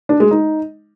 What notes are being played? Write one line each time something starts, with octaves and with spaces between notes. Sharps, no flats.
D4
G#3
D#4